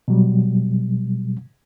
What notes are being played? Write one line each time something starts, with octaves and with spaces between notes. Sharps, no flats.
B2 F#3 G3